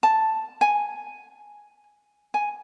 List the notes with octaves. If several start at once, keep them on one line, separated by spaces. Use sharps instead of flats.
A5
G#5
G#5